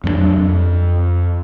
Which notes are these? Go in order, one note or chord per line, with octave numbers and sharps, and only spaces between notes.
F2 F#3 G#3 D4
F2